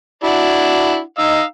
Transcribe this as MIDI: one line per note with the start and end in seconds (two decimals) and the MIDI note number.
0.24 1.00 62
0.24 1.00 64
0.24 1.00 66
1.18 1.44 63
1.18 1.42 75
1.18 1.42 77
1.18 1.42 88